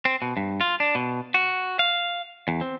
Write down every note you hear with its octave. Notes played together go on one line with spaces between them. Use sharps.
C4
B2
G2
F4
D4
B2
F#4
F5
E2
C4